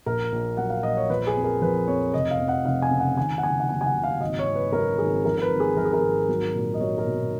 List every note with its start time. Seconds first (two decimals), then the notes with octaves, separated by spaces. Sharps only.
0.06 A#1 A#4
0.32 A#1
0.57 F#3 F#5
0.70 F5
0.83 A#1 D#5
0.97 C#5
1.10 F3 B4
1.27 G#4
1.36 F2
1.44 A#4
1.62 F3 B4
1.88 F2 C#5
2.14 F1 D#5
2.31 F5
2.40 F2
2.48 F#5
2.65 F1 F5
2.82 G#5
2.91 C#3
2.99 F#5
3.17 D#3 G#5
3.38 F#5
3.43 F#1 G#5
3.60 F#5
3.69 F#1 G#5
3.81 G#5
3.86 F#5
3.95 F#1
4.04 F5
4.21 G#1 D#5
4.39 C#5
4.47 G#1
4.55 B4
4.72 F#2 A#4
4.98 G#1 G#4
5.24 F3 A#4
5.38 A#4
5.42 B4
5.51 G#1
5.60 G#4
5.76 F3 A#4
5.85 G#4
5.93 A#4
6.03 G#1
6.29 F#3
6.55 A#2
6.74 D#5
6.80 F#3 C#5
6.98 A#4
7.06 B1